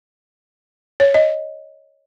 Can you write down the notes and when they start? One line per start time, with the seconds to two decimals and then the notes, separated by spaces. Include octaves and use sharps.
1.00 C#5
1.14 D#5